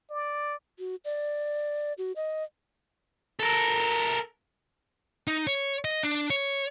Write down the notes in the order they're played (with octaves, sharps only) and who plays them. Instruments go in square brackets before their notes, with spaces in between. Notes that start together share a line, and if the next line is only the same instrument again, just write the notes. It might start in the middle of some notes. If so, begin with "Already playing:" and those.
[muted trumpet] D5
[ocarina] F#4
D5
F#4
D#5
[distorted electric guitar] A4 A#4
D#4
C#5
D#5
D4
C#5